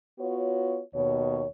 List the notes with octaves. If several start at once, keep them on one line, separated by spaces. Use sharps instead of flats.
B3 F4 F#4 C#5
D#2 B2 C#5